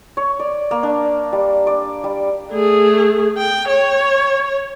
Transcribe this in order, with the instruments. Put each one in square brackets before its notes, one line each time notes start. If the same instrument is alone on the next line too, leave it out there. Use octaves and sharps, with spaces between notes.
[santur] C#5
D5
A#3
D4
G3
D5
G3
[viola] A3 G#4
G5
C#5